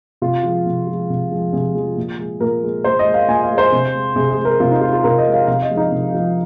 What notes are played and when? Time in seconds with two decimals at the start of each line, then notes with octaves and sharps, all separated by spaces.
0.22 C3 F4
0.43 F3 G#3
0.66 C3
0.87 F3 G#3
1.10 C3
1.32 F3 G#3
1.53 C3 G#4
1.75 F3 G#3
1.96 A#2
2.19 G#3
2.40 A#2 A#4
2.63 G#3
2.84 A#2 C5
2.99 D#5
3.06 G#3
3.14 F5
3.28 A#2 G#5
3.44 F5
3.50 G#3
3.58 C5
3.72 C3
3.94 G#3
4.16 C3 G#4
4.31 G#4
4.38 G#3
4.45 A#4
4.60 C3 F4
4.71 D#4
4.81 G#3 F4
4.93 F4
5.04 C3 A#4
5.18 D#5
5.26 G#3
5.34 F5
5.47 C3 F5
5.62 D#5
5.70 F3 G#3
5.77 D#4
5.91 C3
6.14 F3 G#3